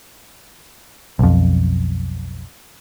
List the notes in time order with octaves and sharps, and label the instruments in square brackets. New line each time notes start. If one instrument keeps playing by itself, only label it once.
[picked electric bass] B1 F2